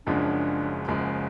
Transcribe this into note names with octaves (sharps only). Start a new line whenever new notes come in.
F#1 F#2 F3 G#3 D4
F#1 F#2 F3 G#3